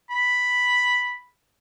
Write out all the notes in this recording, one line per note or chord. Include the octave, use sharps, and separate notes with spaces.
B5